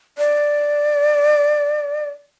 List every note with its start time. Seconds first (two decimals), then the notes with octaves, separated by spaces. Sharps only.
0.18 D5